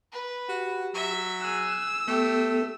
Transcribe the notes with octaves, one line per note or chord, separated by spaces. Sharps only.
B4
F#4 G4
F#3 E5
G#4 E6 F#6
A3 B3 G4 A4